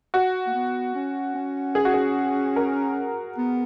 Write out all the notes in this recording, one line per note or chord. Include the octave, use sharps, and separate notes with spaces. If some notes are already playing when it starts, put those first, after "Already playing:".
F#4
A#3
B3
C#4
C#4
G#4
F#4
G#4
A#4
B3